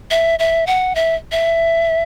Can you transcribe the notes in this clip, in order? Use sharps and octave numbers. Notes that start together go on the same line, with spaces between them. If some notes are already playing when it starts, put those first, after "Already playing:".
E5
E5
F#5
E5
E5